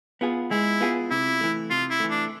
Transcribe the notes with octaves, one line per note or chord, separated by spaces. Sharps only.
B3 F4 G#4
G#3 E4
B3 F4 G#4
C3 E4
E3 A3
C3 F4
E4
E3 A3
D4